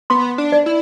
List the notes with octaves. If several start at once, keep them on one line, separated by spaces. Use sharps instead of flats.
B3 C6
D4
D5
E4